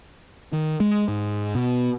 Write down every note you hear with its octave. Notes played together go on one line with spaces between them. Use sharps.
D#3
G#3
G#2
B2